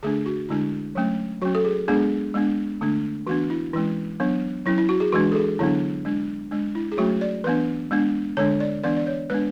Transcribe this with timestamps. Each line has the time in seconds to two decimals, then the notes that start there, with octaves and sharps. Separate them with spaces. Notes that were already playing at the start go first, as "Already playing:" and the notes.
0.03 D3 A3 D4 G#4
0.26 F#4
0.49 D3 G#3 D4 E4
0.95 F#3 A3 C#4
1.42 F#3 C#4 F#4
1.55 A4
1.65 G#4
1.88 G#3 B3 D4 G#4
2.34 G#3 B3 D4
2.81 D3 A3 D4
3.27 E3 B3 D4 F#4
3.50 E4
3.73 E3 G#3 C#4 E4
4.20 F#3 B3 D4
4.66 F#3 C#4 E4
4.78 E4
4.89 F#4
5.00 G#4
5.12 E3 G#3 D4 F#4
5.32 A4
5.35 G#4
5.59 D3 F#3 B3 D4 E4
6.05 G#3 D4
6.51 G#3 D4
6.75 E4
6.92 G#4
6.98 F#3 A3 C#4 F#4
7.21 D5
7.44 E3 B3 D4 B4
7.91 G#3 B3 D4
8.37 D3 G#3 D4 C#5
8.60 D5
8.84 E3 B3 D4 D5
8.97 D5
9.07 C#5
9.30 G#3 B3 D4 B4